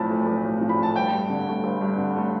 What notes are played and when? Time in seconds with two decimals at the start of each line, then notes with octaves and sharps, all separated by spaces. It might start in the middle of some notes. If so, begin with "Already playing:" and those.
Already playing: B1 A2 F3 A5 B5
0.11 A3
0.27 B1
0.45 A2
0.61 F3
0.69 B5
0.79 A3 A5
0.96 G1 G5
1.13 G2
1.30 D3
1.48 A3
1.64 G1
1.81 G2
1.98 D3
2.16 A3